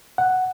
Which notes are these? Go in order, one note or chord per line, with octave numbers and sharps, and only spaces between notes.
F#5